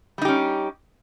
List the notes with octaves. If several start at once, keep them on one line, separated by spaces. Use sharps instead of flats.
G3 C#4 D#4 G4